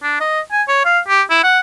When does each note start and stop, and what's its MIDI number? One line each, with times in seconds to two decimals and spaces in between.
0.03 0.19 62
0.21 0.41 75
0.52 0.63 80
0.68 0.80 73
0.85 1.00 77
1.08 1.22 67
1.30 1.41 64
1.43 1.60 78